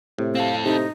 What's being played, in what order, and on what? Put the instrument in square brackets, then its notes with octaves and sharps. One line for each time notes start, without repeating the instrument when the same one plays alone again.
[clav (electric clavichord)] A2 [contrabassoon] C3
[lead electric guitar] C4 A4 [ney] F5
[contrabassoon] C3 [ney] D#4